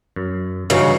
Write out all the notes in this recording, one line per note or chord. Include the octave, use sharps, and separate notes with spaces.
F#2
G2 C#3 E3 D#4 F#4 B4